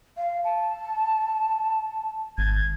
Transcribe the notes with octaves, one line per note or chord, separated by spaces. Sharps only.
F5
A5
G#1 G#6